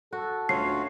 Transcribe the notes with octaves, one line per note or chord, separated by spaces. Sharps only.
F#4 A4
D2 C#4 F4 F#4 C#5 C7